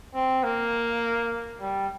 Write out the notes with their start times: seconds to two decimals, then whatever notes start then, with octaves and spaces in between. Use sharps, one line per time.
0.15 C4
0.44 A#3
1.61 G3